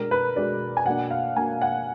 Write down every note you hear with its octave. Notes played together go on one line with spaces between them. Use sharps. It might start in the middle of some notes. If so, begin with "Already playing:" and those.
Already playing: B2 G#3 D4 A#4
B4
B2 G#3 D4 D5
G#5
B2 A#3 D4 F#5
F5
B2 A#3 D4 G#5
F#5